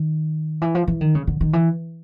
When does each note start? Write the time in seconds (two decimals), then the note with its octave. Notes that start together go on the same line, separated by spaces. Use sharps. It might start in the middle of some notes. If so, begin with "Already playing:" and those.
Already playing: D#3
0.62 E3
0.75 F3
0.88 E3
1.01 D#3
1.15 C#3
1.27 D3
1.41 D#3
1.53 E3